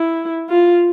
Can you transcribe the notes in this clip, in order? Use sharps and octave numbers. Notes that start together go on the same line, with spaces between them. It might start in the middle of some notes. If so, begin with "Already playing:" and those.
Already playing: E4
F4